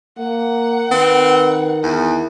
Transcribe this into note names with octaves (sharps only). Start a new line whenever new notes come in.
A#3 F#5
D#3 C4 B4
E2 E4